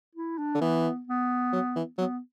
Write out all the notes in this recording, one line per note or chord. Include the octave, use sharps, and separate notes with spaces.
E4
D4
D3
E3 B3
B3
F#3
E3
F#3 B3